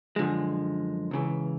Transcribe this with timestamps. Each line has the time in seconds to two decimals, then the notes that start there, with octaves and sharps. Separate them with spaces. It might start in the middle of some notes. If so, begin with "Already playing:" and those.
0.16 F#2 D3 F3 G#3
1.11 C#2 C#3 E3